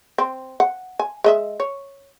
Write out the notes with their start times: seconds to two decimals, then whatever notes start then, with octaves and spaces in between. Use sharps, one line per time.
0.18 C4
0.60 F#5
1.00 G#5
1.24 G#3 D#5 E5
1.60 C#5